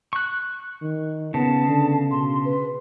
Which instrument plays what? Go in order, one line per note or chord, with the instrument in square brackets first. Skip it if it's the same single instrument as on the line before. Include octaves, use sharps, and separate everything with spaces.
[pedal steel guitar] C#6 F#6
[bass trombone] D#3
[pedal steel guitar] C#3 [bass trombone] B3 [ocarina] A5
[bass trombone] D3
[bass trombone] B2 [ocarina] C6
[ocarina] B4